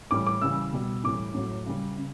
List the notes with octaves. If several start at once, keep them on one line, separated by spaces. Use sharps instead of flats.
A2 E3 G3 D6
D6
C#3 E3 G3 E6
B2 G3
A2 E3 G3 D6
A2 F#3
C#3 G3
C#3